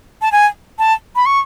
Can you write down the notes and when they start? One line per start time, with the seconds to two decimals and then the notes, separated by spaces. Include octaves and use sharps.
0.22 A5
0.32 G#5
0.79 A5
1.16 B5
1.26 C#6